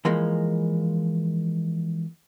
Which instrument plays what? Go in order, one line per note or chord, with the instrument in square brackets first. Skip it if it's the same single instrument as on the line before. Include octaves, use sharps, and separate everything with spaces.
[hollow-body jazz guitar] E3 F3 G#3 A#3